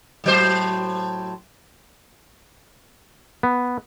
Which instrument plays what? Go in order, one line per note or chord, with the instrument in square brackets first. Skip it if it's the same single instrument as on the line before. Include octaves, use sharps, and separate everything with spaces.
[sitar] A2 F#3 C5
[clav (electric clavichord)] B3